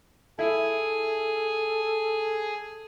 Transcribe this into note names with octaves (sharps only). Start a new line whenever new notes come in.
E4 G#4 A4